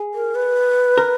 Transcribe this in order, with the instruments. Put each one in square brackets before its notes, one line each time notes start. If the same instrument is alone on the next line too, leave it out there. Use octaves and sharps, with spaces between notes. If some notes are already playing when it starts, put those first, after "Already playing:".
Already playing: [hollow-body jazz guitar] G#4
[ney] A#4
B4
[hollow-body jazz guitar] A#4